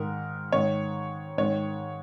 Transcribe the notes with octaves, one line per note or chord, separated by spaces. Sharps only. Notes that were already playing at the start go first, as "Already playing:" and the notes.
Already playing: G#2 D#3 A#4
G#2 D#3 C#5
G#2 D#3 C#5